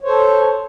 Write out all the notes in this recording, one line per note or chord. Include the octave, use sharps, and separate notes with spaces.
A4 C5 C#5